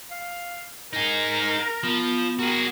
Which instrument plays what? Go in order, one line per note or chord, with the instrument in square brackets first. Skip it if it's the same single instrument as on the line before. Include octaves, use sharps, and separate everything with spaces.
[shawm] F5
[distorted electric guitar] D#4 G#4 [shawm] A#4
[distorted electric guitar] F3 [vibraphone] B3
[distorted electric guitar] F#4 G#4 [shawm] A#4